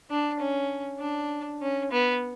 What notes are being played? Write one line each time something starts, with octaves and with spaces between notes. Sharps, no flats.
D4
C#4
D4
C#4
B3